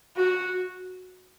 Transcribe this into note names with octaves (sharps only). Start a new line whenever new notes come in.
F#4